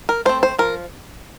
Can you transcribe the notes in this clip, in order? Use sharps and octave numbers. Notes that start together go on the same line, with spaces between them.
A#4
A3 C4 C5
C5
F3 A#4